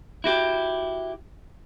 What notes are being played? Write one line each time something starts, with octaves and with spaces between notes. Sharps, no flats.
E4 F#4 G4